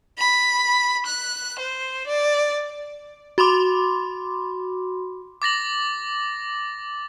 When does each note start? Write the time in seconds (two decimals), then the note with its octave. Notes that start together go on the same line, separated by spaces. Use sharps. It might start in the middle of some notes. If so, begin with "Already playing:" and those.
0.18 B5
1.06 F#6
1.59 C5
2.07 D5
3.38 F#4 B5 C6 D6
5.42 D6 A6 A#6 F#7